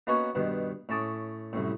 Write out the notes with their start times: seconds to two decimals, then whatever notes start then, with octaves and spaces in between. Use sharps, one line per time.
0.07 A#3 B3 C#4 D#4 F#4 C#5
0.35 G2 B2 D#3
0.89 A2 C#4 A5 D6 D#6
1.53 C2 F#2 A2